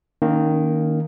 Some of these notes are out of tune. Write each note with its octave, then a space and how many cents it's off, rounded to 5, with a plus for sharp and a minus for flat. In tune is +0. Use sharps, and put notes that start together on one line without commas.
D#3 +0 A#3 +0 C#4 +30